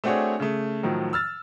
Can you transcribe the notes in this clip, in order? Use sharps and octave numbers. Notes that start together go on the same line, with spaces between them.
A3 C4 D4 F#4 G#4 C#5
C#3 A3
A2 D#3 F3 F#3
E6 F6 A6